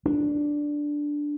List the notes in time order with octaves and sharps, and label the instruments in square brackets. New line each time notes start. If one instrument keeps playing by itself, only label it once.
[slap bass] D4